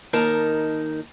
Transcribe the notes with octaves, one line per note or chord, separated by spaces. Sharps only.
D#2 D#4 A#4 A5